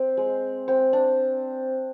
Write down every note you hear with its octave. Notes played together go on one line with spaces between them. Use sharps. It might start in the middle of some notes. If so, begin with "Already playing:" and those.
Already playing: C4
G#3
C4
D4